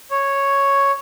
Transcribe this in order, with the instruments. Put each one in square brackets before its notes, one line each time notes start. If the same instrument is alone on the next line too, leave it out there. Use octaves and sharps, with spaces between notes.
[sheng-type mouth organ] C#5